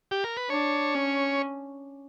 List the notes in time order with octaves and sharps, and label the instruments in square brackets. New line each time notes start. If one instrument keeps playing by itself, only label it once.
[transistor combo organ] G4
A#4
B4
[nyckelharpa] D4 [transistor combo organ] C#5
[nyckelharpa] C#4